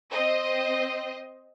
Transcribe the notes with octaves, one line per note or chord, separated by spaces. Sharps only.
C4 C5 D#5